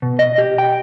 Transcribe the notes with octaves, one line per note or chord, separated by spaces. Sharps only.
B2
D#5
G4
G5